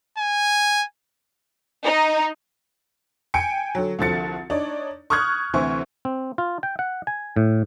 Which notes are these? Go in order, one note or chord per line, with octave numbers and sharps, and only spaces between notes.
G#5
D#4
G5 G#5 C#7 D7
D3 F#3
C2 D3 F3 F#4 A6 C#7
D4 D#4 C#5 D5
C#6 D#6 F6 F#6 G#6
D2 C3 E3 E4 C5 C#6
C4
F4
G5
F#5
G#5
A2